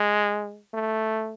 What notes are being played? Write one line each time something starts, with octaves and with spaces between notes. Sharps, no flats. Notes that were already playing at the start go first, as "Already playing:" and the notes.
Already playing: G#3
A3